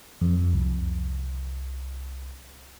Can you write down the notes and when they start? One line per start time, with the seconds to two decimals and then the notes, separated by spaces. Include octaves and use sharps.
0.21 F2
0.53 C2